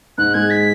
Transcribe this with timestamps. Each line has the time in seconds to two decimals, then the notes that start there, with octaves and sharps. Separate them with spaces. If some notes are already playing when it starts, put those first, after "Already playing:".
0.18 G#2 F#6
0.34 G#3 G#6
0.50 B6